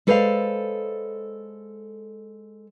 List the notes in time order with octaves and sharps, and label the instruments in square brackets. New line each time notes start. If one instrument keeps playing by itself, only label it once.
[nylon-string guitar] G#3 A4 B4 C5 D5 F5